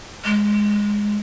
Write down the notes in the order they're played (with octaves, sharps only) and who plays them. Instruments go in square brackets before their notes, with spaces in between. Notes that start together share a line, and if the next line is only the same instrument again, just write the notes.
[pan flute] G#3